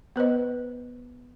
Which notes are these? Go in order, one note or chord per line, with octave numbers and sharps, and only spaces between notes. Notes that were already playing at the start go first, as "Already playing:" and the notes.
B3 B4 C5 D#5